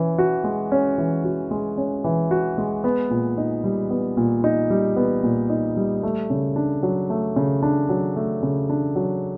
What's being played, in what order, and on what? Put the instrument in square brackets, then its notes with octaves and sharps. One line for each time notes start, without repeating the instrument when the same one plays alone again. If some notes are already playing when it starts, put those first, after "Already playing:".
Already playing: [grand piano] E3 C#4
F#4
G#3
C#4
E3
F#4
G#3
C#4
E3
F#4
G#3
B3
A#2
D#4
G3
B3
A#2
D#4
G3
B3
A#2
D#4
G3
A3
C#3
D4
F#3
A3
C#3
D4
F#3
A3
C#3
D4
F#3